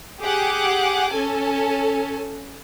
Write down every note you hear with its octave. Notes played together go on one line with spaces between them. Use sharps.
G4 G#4 F#5 D6
C#4 A4 G#5